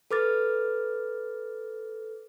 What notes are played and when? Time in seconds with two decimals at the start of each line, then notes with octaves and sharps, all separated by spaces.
0.11 A4 B4 D6 F6 A6